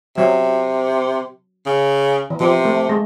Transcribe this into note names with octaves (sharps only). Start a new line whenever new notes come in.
C3 F#3
C#3
E3
C3 F3
A3
G#3